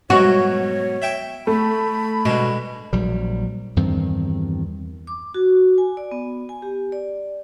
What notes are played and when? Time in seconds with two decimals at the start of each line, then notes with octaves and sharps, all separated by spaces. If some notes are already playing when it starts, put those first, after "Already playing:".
0.10 G#2 B2 F#3 F#4 C#5
1.02 E5 G5 C#6
1.47 A3 B5
2.25 B2 D3 G#3
2.93 A#1 F#3 G3
3.76 E2 G2 D#3 C4
5.07 D6
5.34 F#4
5.78 G#5
5.97 D5
6.12 B3
6.49 G#5
6.62 G4
6.92 D5